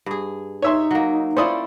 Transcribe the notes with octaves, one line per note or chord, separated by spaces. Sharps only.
G2 G#4
D#4 C#5 E5 C6
F#3 A#3
C#4 E4 F4 C5 D5 D#6